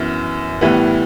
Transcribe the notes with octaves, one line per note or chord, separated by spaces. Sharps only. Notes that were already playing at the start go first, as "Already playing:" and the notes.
Already playing: F#2 E3 B3
A2 E3 G3 B3